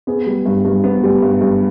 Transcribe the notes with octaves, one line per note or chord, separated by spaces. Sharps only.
B3 G#4
G3
G2
G2
B3
G3
G2
G2